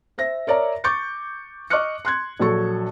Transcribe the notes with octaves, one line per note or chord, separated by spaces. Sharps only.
C5 E5 A#6
A#4 C#5 D5 E5 A#5
C#6 D6 G6 A6 C#7
D#5 C#6 D6 F6 F#6 C#7
C6 F#6 G#6
A#1 F#3 A4 C#6